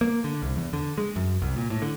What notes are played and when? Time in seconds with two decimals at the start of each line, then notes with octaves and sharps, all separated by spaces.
0.01 A#3
0.24 D3
0.42 C2
0.56 E2
0.73 D3
0.98 G#3
1.16 F#2
1.42 C2
1.56 A#2
1.70 A2
1.82 D3